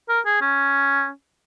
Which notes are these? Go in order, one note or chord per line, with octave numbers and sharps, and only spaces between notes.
A#4
G#4
C#4